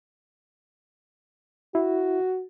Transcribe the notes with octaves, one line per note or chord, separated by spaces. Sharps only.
E4 F#4